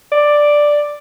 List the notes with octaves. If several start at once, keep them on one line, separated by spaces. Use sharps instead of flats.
D5